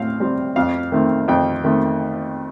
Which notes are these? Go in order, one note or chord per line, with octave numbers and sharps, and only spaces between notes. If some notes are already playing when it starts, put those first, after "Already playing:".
Already playing: A2 C4 F5
G3 C4
F2 F5
D#3 A3 C4
F2 G5
D#3 A3 C4